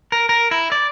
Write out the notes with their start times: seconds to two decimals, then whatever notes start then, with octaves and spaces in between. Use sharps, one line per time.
0.12 A#4
0.29 A#4
0.51 E4
0.72 D5